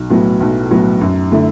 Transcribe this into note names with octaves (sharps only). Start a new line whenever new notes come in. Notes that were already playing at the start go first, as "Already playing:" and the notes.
Already playing: B1
A2 F#3 B3
B1
A2 F#3 B3
F#2
D3 A3 E4